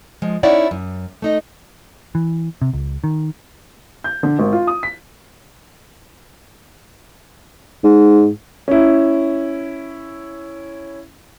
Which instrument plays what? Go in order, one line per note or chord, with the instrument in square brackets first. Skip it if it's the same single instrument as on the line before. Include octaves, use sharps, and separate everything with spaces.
[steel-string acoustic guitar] F3 G#3
C#4 D#4 E4 C#5 D5 F#5
F#2
A3 D#4 D#5
[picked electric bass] E3
C3
C#2
D#3
[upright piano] G6
D3
G#1
F4
D#6
B6
[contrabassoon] G#2
[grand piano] C#4 E4